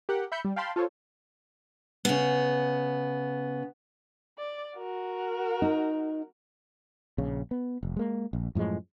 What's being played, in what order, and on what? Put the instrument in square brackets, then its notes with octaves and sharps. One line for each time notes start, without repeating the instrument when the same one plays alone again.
[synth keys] G4 A#4 F#5 G5
E5 B5 G6 C#7
G3
F5 G5 A5 B5 C6
F4 A4 C5 C#5
[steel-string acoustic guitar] C#3 B3
[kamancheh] D5
F#4 A#4
[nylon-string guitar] D#4
[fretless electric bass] A#1 C#3
B3
F1
G#3 A#3
A#1
F#2 A2 F3 G#3